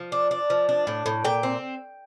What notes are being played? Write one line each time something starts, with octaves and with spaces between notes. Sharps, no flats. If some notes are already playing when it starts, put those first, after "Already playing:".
Already playing: F3
D4
D4
F3
D4
A2
A2
A#2 G5
C4